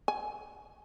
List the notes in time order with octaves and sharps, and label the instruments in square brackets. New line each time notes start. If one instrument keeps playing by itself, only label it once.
[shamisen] G#5